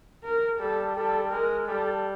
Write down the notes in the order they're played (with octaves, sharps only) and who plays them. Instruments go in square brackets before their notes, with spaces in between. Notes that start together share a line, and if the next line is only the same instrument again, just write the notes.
[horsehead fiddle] A#4
[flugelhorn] G3 [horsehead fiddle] A4
[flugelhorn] G3 [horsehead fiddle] A4
[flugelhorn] G#3 [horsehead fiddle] A#4
[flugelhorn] G3 [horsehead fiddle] A4